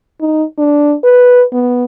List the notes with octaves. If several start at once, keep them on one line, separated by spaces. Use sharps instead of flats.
D#4
D4
B4
B3